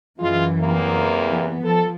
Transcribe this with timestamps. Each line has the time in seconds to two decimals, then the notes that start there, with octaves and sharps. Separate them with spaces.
0.20 F#2 E3 G#3 F4
0.60 E2 C3 A#3
1.30 E3 B3
1.64 F3 A4